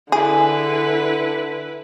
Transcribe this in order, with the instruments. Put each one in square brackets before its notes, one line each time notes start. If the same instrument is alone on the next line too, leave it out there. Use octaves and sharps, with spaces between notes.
[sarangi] D3 [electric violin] E4 B4 [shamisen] G#4